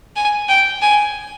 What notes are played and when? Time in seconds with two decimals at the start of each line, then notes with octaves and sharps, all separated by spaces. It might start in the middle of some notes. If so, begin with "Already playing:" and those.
0.16 G#5
0.49 G5
0.82 G#5